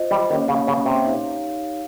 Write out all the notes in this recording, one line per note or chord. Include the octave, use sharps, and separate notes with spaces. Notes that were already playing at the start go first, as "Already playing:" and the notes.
Already playing: F4 C5 D#5
G3
D#3 A#3 C#4 G4 C#5 F5
C#3
C#3
C3
D#4 G4 C#5 F5